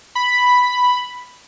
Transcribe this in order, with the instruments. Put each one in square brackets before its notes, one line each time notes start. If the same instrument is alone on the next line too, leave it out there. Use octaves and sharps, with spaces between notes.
[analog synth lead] B5